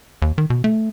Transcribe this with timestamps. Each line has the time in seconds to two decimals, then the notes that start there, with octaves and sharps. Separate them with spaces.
0.22 D#2
0.38 D#3
0.50 B2
0.64 A3